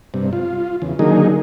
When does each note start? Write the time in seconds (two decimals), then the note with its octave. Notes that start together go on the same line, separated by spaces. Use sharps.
0.14 G2 C3
0.33 F4
0.82 E2 C#3
0.99 D3 D#3 F#3 A#3 D#4 G#4